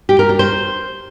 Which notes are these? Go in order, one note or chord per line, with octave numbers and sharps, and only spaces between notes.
G4
A#4
D4
C5